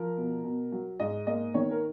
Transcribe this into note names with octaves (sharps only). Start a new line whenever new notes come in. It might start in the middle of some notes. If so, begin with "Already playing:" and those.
Already playing: F3 A#4
B2
B2
F#3
G#2 D#5
A#3 D#5
D#3 C#5
A#4